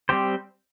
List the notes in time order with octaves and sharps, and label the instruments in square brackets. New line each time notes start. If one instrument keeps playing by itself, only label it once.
[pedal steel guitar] G3 C4 G4 C5